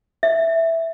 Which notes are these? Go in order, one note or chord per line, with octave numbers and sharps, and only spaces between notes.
E5